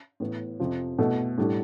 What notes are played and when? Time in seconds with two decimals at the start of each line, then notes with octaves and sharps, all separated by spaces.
0.20 A2 E3 B3
0.60 F2 C3 F3
0.98 B2 A3 E4 A4
1.38 A2 G3 D4 A4